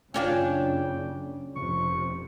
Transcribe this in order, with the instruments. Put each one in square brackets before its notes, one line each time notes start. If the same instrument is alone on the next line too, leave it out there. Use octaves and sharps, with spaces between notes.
[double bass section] F#1 C#3 [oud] C#4 D4 F4 [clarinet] G5
[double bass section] F1 F2 C3 [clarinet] C#6